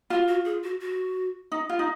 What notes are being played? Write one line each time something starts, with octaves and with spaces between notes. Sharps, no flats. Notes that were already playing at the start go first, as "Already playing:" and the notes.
F4 F#4
F#4
G#4
F#4
F#4
D#4
F4
D#4